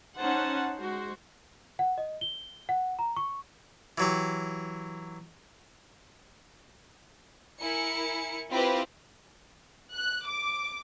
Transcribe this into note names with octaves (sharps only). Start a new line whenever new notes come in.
C#4 D#4 C5 F#5 A5
G#3 F#4 C5
F#5
D#5
G7
F#5
A#5
C#6
E3 F#3 G4
E4 A#4 G#5 C#7
C4 E4 F4 G4 B4 C5
F#6
D6